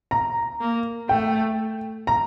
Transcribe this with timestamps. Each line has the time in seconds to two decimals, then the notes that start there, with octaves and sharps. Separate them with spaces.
0.11 A#5
0.61 A#3
1.09 A3 G5
2.07 A#5